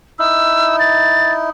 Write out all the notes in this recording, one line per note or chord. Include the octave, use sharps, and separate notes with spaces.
D#4 E4 E6
A6